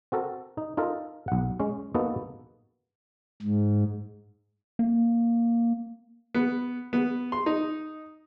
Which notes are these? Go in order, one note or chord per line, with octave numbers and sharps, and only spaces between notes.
C4 F#4 A4 A#4
D#4
D#4 F4 A4 A#4
B1 F#5
G#3 C#4
A#3 B3 D#4 F#4 A4
G#2
A#3
B3
B3
C6
D#4